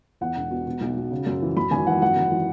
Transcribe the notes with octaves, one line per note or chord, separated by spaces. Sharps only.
E2 F#5
E1
B2
B2
B1
F#3
C#3
F#2
E3
F#2 B5
G#1 G#5
E3 F#5
F#2 F#5
G#1
E3